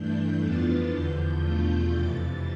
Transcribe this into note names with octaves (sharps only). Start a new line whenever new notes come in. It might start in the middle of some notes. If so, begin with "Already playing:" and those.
Already playing: G2 E3 A3 D4 G6
F2 E3 B3 D4 F4 A6
E2 D3 F3 G6
E2 B2 A3 D4 F4 G6
F2 C3 E3 A6